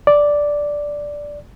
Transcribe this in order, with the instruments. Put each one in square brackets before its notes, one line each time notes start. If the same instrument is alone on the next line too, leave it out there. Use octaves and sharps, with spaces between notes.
[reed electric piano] D5